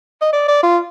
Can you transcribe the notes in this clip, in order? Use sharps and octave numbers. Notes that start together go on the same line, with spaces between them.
D#5
D5
D5
F4